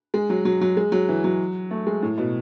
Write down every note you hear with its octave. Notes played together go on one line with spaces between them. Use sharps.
G#3
F#3
F#3
F#3
G#3
F#3
E3
F#3
A3
G#3
A2
B2